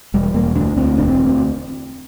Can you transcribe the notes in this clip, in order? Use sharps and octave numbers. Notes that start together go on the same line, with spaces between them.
E1 G3
E1 A#3
D2 D4
D2 C4
E1 D4
C4
D2